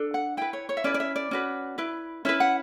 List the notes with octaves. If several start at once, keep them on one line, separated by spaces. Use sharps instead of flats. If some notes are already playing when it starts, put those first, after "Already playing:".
Already playing: D4 A4
F#5
E4 B4 G5
C#5
C#5
E5
C#4 E4 B4 D5
D5
E5
D5
C#4 F#4 B4
E4 B4
C#4 E4 B4 E5
F#5